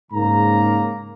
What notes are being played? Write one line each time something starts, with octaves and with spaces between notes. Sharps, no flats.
G#2 C#3 A#3 A#5